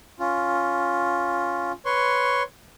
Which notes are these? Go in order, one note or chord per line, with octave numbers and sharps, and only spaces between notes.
C#4 F4
B4 C#5 C6 C#6